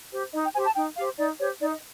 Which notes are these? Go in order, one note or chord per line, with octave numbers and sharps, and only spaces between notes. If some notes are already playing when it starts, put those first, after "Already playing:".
G4 C5
D#4 D#5
G5
G4 C5 G#5
A5
D#4 G5
G4 C5 F5
D#4 D5
G4 C5 C#5
D#4 D5
D#5